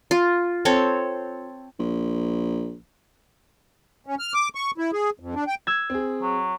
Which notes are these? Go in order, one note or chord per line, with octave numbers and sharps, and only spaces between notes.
F4
C4 A4 C#5
A#1
C#4
F6
D6
C#6
E4
G#4
F2
D4
G5
E6 G#6
C4 G#4
F#3